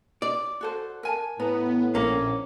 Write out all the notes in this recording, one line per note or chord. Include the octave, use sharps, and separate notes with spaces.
D5
F#4 A4 C5
A#4 G#5 A5
A2 B3 A#5
A#1 A#3 C#4